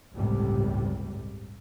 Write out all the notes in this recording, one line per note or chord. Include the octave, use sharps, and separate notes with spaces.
G1 C#2 A2 C3 G3